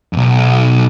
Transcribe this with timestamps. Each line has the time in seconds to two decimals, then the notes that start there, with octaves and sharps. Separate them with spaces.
0.13 B1 F2